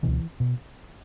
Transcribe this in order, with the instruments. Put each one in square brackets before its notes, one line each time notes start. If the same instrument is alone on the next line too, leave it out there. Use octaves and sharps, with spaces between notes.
[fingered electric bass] C#2 B2 E3
B2